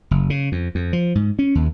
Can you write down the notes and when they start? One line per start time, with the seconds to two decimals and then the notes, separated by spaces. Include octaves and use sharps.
0.11 F#1
0.30 C#3
0.52 F2
0.75 F2
0.93 F3
1.15 G#2
1.39 C#4
1.55 D#2